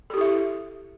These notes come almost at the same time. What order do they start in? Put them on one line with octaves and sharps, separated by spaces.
A4 G4 E4 E5